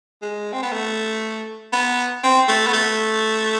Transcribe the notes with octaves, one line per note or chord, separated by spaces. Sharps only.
G#3
C4
B3
A3
B3
C4
A3
B3
A3